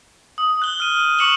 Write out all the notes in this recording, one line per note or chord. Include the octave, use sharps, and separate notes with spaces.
D#6
F#6 G7
F6 D#7
C#6 D6 C#7 E7 F#7 G7